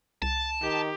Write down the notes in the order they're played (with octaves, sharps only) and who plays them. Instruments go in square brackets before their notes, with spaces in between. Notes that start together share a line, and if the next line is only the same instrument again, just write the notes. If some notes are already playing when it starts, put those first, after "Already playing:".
[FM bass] C2 [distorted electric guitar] A5
[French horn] D#3 [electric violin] G4